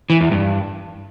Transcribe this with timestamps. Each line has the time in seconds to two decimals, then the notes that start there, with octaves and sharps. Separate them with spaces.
0.10 E3
0.21 E2
0.31 G2